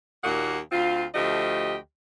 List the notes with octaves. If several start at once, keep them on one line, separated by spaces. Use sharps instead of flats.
D#2 A#2 A#3 F#4 F#5
D2 C4 F4
D2 F3 A3 G4 D#5